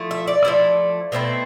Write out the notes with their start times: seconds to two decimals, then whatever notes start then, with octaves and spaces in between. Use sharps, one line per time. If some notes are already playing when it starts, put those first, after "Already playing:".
Already playing: F3 A3 E4
0.11 E5
0.27 D5
0.45 F3 A3 E4
1.12 B2 A3 C4 E4